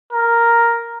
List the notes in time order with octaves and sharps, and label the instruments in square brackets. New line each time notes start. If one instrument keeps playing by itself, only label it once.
[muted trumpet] A#4